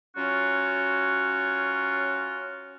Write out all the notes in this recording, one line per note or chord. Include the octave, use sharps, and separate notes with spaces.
F#3 C#4 F4 F#4 C#5